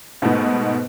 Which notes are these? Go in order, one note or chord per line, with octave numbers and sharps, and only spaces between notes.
G#2 B2 A3 B3 D#4